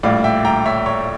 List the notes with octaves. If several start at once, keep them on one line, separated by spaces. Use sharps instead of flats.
A#1 A2 G3 D5 F5
E5 G5
G5 A#5
C#5 E5
C#5